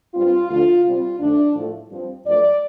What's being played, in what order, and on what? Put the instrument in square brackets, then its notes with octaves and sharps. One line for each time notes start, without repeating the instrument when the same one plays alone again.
[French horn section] G2 G3 C4 F4
D2 D3 F3 A3 F4
C3 G3 C4 F4
F2 D3 A3 D4
A2 F3 A3
G2 F3 C4
G2 F3 A3 D5